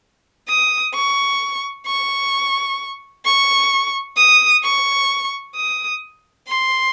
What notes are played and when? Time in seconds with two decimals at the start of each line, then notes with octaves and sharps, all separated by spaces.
0.48 D#6
0.95 C#6
1.86 C#6
3.25 C#6
4.17 D#6
4.63 C#6
5.55 D#6
6.47 C6